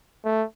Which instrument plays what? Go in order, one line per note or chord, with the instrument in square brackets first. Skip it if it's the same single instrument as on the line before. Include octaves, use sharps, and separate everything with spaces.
[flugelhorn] A3